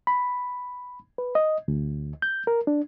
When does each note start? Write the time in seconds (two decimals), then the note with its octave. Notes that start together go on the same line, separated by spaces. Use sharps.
0.07 B5
1.18 B4
1.35 D#5
1.68 D2
2.22 G6
2.47 A#4
2.67 D4